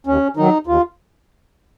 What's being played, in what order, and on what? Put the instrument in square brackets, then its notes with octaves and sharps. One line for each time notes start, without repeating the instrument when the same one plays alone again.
[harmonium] D#2 C#4
D#3 F#3 D#4
D#2 F4